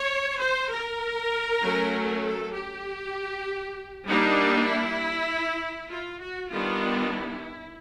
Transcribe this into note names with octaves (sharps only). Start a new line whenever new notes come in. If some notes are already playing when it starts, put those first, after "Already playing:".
Already playing: C#5
C5
A#4
F#3 A3 C#4
A4
G4
G3 A#3 D4 D#4
E4
F4
F#4
D#3 G3 B3 D4 F4
E4